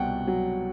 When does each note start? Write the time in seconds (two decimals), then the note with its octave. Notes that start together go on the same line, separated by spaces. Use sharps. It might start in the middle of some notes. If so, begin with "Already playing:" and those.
Already playing: C2 B2 F#5 G5
0.27 F#3